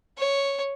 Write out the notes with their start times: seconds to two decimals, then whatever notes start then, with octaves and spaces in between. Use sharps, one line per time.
0.18 C#5